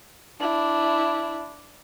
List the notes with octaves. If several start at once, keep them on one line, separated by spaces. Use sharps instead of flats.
D4 E4